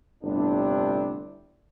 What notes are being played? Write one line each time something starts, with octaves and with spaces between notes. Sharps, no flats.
G1 A2 C3 B3 D4